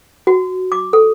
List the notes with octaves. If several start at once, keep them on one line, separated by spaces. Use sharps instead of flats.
F#4
D6
A4